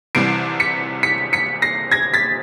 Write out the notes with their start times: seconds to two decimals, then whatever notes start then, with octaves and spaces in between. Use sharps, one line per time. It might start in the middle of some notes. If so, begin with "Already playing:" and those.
0.15 C2 C3 E3 G3 C7 D7
0.60 B6 C#7
1.03 B6 C#7
1.33 B6 C#7
1.62 A#6 C7
1.91 G#6 A#6
2.14 A6 B6